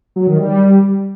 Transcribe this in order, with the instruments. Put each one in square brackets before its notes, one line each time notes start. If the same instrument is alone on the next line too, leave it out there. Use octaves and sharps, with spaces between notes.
[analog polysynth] F#3
D#3
G3